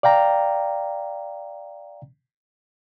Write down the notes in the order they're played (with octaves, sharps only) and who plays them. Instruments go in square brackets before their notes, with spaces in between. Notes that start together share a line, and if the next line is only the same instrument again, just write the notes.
[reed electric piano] D5 F5 G5 A#5